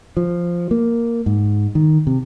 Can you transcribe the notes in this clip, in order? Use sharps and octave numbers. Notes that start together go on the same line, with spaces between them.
F3
A#3
G#2
D#3
C3